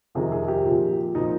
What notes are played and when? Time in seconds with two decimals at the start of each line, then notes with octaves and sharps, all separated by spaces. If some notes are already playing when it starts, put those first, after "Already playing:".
0.15 F2 C3 D#3 G#4
0.32 G#4
0.48 G4
0.65 A#2 F3
1.15 A#2 F3 D#4